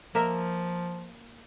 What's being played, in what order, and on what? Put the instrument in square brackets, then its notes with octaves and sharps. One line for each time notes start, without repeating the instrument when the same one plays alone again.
[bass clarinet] F3 [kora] A#3 A#4 E5